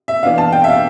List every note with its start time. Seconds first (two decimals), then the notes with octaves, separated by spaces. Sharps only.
0.08 E5
0.23 E3 B3 D4 F5
0.38 A5
0.52 G5
0.64 E5
0.68 F5